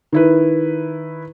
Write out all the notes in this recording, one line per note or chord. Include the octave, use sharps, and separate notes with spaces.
D#3 E4 B4